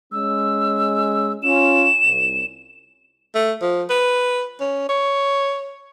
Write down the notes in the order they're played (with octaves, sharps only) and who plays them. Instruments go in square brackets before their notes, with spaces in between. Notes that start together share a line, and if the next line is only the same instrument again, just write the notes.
[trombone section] G#3 C#4 [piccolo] E6
[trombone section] C#4 F4 [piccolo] E7
[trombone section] C2
[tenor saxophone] A3
F3
B4
C#4
C#5